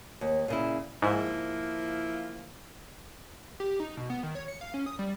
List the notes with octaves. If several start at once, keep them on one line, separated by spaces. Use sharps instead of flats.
D#2
A#2 C#3 E4
G#2 F3 A#3 E4
G4
D#4
B2
B3
D#3
C#5
C#7
F5
C#4
D#6
G3